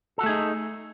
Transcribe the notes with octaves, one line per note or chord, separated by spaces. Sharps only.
A3 D#4 F#4 G#4 A4